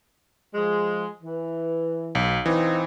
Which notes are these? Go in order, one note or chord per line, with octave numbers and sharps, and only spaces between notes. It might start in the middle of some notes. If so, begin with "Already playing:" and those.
F3 G#3
E3
B1
E3 C4 D#4 F4